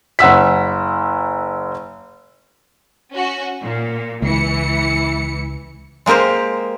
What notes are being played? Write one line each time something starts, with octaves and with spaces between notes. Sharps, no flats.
F#1 F#5 E6 B6
C#4 F#4
A#2
C#2 E3 C#7
G#3 A#3 G4 A#4 C5